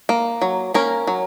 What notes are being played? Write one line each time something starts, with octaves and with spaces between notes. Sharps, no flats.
A#3
F#3
A#3 C#4 A#4
F#3